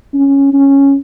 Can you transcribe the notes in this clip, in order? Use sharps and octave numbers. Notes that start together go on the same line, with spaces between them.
C#4
C#4